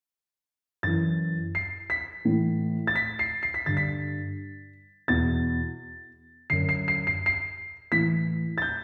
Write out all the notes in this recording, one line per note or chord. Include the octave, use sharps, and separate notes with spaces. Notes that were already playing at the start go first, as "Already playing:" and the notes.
F#2 E3 A6
C7
B6
A2 E3
A6
B6
C7
C7
B6
G2 D3 A6
B6
E2 B2 A6
F#2 D3 C7
C7
C7
C7
C7
A2 E3 B6
A6
G6